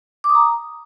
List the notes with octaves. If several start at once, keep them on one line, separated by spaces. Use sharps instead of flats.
D6
D#6
A#5